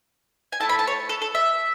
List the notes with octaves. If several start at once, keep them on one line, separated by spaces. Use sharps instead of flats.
G#5
A3 E4 A4 A5
B5
A5
C#5
A4
A4
E5